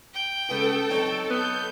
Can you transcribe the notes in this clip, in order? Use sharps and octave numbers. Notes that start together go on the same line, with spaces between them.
G5
C#2 B3 A4
F#3 C4 D#4
B3 G6